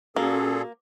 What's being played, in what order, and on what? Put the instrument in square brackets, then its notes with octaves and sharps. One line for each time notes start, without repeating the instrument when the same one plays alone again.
[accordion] A#2 G#4 A4 [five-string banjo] A#3 [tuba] C#4 [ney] F#4